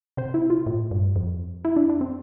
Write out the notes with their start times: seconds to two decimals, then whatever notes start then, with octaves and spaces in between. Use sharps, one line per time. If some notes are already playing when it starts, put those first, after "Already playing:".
0.17 C3 C5
0.34 E4
0.50 F4
0.66 A2
0.91 G2
1.16 F2
1.65 E4
1.76 D4
1.89 D4
2.01 C4